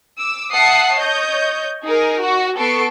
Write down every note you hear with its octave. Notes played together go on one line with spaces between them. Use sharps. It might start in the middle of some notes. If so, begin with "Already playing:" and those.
D6 E6
E5 F#5 A5 D#6 C7
C#5 D#5 G6
D#4 G#4 A#4
F#4
B3 A4 C#6 C7 D7